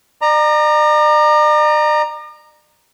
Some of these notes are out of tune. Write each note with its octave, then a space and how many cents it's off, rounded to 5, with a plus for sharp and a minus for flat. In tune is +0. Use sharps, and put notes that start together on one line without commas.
D5 +45 A#5 +0